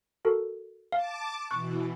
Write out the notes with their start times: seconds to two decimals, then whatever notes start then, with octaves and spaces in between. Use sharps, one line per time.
0.25 F#4 A4 A#4
0.92 F5 A5 D6
1.51 B2 E3 C#6 F#6